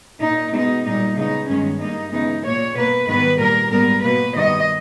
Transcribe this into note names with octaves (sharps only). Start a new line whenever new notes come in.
A#2 A#3 D#4
B2 G#3 B3 D#4
A#2 G3 A#3 D#4
C#3 G#3 B3 D#4
G2 D#3 G#3 B3 C#4
G2 G3 A#3 D#4
C#3 E3 G#3 B3 D#4
A#2 A#3 C#5
B2 A#3 B4
G#2 D#3 G3 B3 B4
A#2 G3 A#3 A#4
G#2 G3 B3 A#4
B2 A#3 B4
G2 D#3 G3 B3 D#5